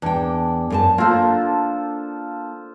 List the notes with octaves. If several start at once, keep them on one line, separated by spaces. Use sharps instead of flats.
E2 D4 G5
F#2 A#4 A5
A#3 D4 F4 A4 C5